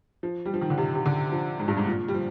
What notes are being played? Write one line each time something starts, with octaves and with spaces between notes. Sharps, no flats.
F3
G3
F3
D#3
D3
C3
C3
D3
F3
G#2
G2
G#2
A#2
G3
F3